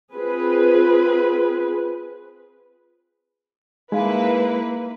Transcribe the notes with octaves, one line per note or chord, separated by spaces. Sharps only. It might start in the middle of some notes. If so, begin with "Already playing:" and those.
C4 F4 G#4 B4
G#3 A#3 D#4 E4 B4 F5